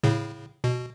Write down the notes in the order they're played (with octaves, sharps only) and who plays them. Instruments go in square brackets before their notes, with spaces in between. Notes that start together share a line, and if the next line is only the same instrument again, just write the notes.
[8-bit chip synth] A2 C#3
B2